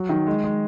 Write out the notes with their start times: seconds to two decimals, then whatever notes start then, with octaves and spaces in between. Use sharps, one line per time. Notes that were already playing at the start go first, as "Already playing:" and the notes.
Already playing: F#3
0.09 D#3
0.27 G#3
0.44 G#3